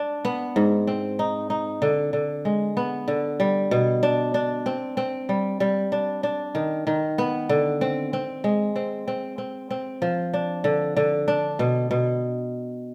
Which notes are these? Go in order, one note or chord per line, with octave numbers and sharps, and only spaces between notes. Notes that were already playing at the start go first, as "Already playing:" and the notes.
Already playing: D4
B3
G#2
C4
D#4
D#4
D3
D3
G#3
B3
D3
G3
B2
D4
D4
C4
C4
G3
G3
D4
D4
D#3
D#3
B3
D3
C4
C4
G#3
C4
C4
C4
C4
F3
D4
D3
D3
D4
B2
B2